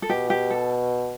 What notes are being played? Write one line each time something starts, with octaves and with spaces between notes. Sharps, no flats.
A4
B2 G4
G4
A4